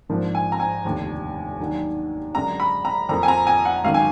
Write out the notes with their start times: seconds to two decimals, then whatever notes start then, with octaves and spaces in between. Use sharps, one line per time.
0.09 A#1 G#2 F3 A#3 D4
0.35 G#5
0.52 A#5
0.60 G#5
0.85 F1 D#2 D3
1.60 D#2 D#3 F#3 D4
2.35 F#2 D3 G#3 D4 A#5
2.60 B5
2.85 A#5
3.09 F2 F3 A#3 A#5
3.23 G#5
3.28 A#5
3.47 G#5
3.65 F#5
3.84 G#1 F#2 D#3 F5
3.94 G#5